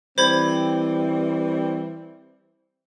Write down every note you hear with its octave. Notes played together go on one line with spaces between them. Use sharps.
E3 G3 C4 C5 B5 G#6